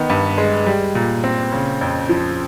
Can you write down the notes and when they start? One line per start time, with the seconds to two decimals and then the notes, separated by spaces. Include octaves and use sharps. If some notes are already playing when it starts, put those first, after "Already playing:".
Already playing: D#3 B3
0.10 G2
0.38 G#3
0.66 G3
0.95 A#2
1.24 C4
1.52 C#3
1.81 F2
2.09 F3